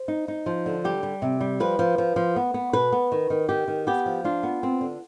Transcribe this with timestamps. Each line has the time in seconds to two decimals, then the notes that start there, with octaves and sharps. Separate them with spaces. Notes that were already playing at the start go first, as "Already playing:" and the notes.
Already playing: C5
0.08 D#4
0.28 D#4
0.46 F3
0.66 D3
0.84 G3 G4
1.03 G3
1.22 C3
1.41 G3
1.60 F3 B4
1.79 F3
1.98 F3
2.16 F3
2.36 B3
2.54 B3
2.73 B2 B4
2.92 B3
3.12 D#3
3.30 D#3
3.49 D#3 G4
3.68 D#3
3.87 B3 G4
4.06 F3
4.24 D4 F4
4.43 B3
4.63 C4
4.81 D3